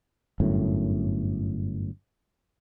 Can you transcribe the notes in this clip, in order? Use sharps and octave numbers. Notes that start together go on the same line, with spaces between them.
G1 F#2 A2